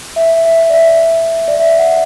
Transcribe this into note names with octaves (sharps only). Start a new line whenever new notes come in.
E5
E5
D5
E5
D5
E5
F#5